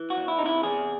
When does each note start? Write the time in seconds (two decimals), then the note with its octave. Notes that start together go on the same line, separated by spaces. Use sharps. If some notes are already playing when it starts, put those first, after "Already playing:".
Already playing: E3
0.10 F#4
0.17 E2
0.28 E4
0.39 C3 D#4
0.46 E4
0.63 E2 G#4